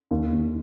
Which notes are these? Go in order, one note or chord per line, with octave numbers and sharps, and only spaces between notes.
D#2
D#2